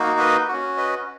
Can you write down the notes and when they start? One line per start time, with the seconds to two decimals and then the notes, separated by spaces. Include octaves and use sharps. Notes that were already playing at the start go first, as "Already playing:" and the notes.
Already playing: A#3 D#4 F#4
0.19 B4 D#5
0.48 C#4 F#4
0.77 B4 D#5